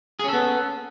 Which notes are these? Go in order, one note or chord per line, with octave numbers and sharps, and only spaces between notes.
B3 C#4 G#4 A4